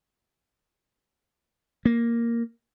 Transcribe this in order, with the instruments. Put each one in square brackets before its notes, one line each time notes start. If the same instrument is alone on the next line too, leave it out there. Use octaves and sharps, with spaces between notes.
[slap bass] A#3